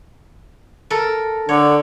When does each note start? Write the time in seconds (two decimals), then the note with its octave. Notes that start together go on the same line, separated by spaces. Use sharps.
0.90 A4 A#4
1.49 D3 C#5